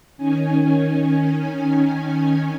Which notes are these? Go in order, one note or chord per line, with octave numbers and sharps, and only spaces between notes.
D#3 C#4 G#5